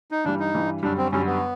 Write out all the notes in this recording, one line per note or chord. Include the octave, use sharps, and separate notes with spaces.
D#4
G2 E3 G3 D4
D#4
G2 E3 G3
F#2 D3 G3 D4
C4
F#2 D3 G3 C#4
B3